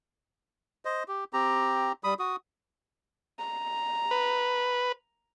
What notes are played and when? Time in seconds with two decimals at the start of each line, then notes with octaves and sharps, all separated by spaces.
0.85 C5 D#5
1.08 G4
1.33 C4 G4 A#5
2.04 G3 B5 D#6
2.19 F#4 D#6
3.39 A#5
4.11 B4